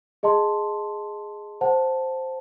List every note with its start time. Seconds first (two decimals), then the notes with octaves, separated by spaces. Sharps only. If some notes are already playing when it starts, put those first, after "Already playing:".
0.23 G#4 D#5 A5 C6
1.61 C5 F#5 A5